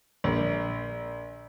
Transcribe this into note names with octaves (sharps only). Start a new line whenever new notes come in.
A#1